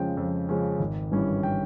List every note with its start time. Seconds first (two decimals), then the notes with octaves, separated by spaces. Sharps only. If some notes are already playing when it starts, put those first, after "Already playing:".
Already playing: F2 C#3 F3 G#3 C#4 G5
0.17 F2
0.49 C#3 F3 G#3 C#4
0.79 G#1
1.11 G2 E3 G3 C#4
1.43 G5